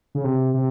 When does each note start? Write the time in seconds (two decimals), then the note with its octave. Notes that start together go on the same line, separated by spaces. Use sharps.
0.15 C#3
0.24 C3
0.54 C3